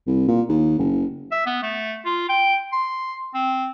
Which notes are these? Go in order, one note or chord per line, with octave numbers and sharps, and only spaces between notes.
C2
A#2
D#2
F#1
E5
B3
A3
F4
G5
C6
C4